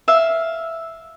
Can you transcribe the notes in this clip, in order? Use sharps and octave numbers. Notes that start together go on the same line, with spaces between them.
E5 F5